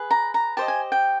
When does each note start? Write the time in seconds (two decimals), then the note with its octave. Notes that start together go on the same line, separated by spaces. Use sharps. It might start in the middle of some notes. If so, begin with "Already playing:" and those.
Already playing: G#4 B4
0.11 A#5
0.34 A#5
0.57 G4 C5 D#5 A5
0.68 G#5
0.92 G5